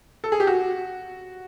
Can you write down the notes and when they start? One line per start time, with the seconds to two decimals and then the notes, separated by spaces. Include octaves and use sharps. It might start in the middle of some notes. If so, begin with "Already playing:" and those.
0.24 A4
0.32 G#4
0.40 G4
0.47 F#4